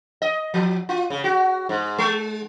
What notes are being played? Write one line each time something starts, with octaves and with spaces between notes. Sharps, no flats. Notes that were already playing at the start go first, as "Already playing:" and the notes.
D#5
F3
F4
C#3
F#4
G#2
G#3